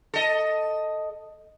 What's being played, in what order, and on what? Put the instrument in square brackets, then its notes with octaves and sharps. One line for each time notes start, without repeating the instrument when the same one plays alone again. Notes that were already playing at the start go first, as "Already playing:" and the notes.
[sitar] A4 D#5